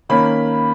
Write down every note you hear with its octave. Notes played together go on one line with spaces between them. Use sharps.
D#3 A#3 C#4 B5